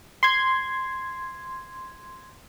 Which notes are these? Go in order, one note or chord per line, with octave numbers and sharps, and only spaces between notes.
C6 G#6